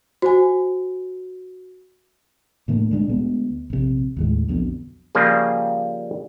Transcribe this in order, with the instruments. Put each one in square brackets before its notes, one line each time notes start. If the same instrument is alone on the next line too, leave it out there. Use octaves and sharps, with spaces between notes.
[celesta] F#4 [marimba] C5 G#5
[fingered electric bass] A2 D3 A3 A#3
A#2 G#3 D4
D2 G#3 B3
A#1 C3
D#2 A2 G#3
B1 F2 B2 D3
[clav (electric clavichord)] C#3 F3 G3 A#3 F4 G#4